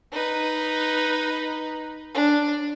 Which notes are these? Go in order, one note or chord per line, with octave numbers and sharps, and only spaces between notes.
D#4 B4
D4